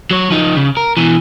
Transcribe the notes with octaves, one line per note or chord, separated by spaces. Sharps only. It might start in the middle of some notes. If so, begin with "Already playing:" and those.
F#3 C#5
F3 D#4
C#3
A#4
B2 E3